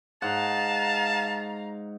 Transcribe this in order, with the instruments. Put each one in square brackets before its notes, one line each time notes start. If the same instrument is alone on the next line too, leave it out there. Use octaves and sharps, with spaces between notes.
[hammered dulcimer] G#2 F#5 [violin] F5 A#5 [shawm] A5